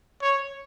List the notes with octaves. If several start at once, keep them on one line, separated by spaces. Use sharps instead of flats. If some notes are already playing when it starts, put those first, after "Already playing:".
C#5